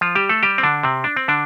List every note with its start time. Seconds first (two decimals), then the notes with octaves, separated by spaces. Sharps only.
0.01 F3 F4
0.15 G3 G4
0.29 A3 A4
0.43 G3 G4
0.58 C4
0.63 D3 D4
0.83 C3 C4
1.04 D4
1.16 C4
1.28 D3 D4